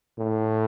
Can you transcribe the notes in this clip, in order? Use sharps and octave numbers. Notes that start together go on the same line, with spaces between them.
A2